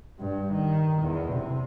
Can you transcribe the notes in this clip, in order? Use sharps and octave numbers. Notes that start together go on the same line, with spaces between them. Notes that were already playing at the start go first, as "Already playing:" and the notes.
G2
D#3
E2
C3